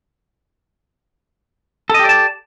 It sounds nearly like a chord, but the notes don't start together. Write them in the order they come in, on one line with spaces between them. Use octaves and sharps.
A4 D#5 G4 D5 A5